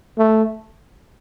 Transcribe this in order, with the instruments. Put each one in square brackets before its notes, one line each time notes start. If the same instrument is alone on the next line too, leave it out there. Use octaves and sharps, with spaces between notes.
[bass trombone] A3